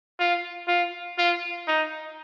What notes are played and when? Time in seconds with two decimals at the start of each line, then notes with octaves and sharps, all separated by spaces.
0.19 F4
0.68 F4
1.18 F4
1.68 D#4